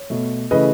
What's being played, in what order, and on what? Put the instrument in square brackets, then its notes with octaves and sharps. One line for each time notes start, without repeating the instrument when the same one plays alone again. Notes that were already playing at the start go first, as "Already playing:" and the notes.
Already playing: [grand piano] C#5
B2 A3
C#3 E3 A3 B4 D#5